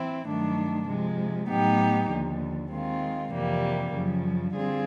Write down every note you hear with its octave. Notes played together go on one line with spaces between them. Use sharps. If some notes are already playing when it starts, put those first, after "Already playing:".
Already playing: E3 C4 E4
G2 D#3 F#3 A3 D4
C3 F3 G#3
A2 F#3 B3 D#4 G4
D#2 D3 F3
D#3 G#3 C4 F4
F2 C3 E3 G3 A#3
F#2 C#3 F3
D3 G3 C4 F4 G#4